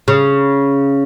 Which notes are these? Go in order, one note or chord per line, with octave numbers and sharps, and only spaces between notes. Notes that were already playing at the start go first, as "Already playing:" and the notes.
C#3